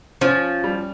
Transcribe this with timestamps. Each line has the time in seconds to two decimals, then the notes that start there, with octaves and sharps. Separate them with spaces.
0.21 F3 C#4
0.64 G3